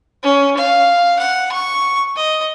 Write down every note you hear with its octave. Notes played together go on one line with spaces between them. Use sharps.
C#4
F5
F#5
C#6
D#5